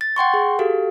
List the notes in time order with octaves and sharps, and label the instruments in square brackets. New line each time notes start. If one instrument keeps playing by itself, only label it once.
[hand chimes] A6
F#5 G5 C6 C#6
G#4
F#4 G4 A4 F5